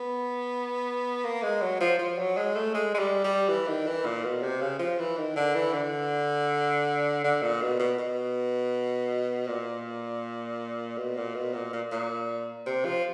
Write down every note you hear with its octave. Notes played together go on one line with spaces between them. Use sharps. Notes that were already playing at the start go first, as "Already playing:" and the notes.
Already playing: B3
A#3
G#3
F#3
F3
F3
F#3
G#3
A3
G#3
G#3
G3
G3
E3
D#3
E3
A#2
B2
C3
C#3
F3
E3
D#3
D3
E3
D3
D3
A#2
B2
B2
B2
A#2
B2
A#2
B2
A#2
A#2
A#2
C3
F3